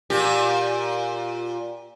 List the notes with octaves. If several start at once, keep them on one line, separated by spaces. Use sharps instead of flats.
A#2 G4